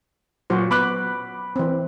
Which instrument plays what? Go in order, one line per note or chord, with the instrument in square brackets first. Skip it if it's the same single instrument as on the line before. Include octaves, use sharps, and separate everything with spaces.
[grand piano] A#2 [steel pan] F#3 F#4 C5
[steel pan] B3 [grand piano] B5 D6 F#6
[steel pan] E3 C4